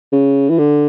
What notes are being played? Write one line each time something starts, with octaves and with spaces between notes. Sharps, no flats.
C#3
E3
D3